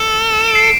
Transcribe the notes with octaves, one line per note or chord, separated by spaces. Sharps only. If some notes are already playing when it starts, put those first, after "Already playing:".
Already playing: A4
E7
D7
C7
D7